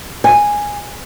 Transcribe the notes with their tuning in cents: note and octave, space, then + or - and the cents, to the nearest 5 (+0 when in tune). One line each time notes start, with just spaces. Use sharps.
G#5 -5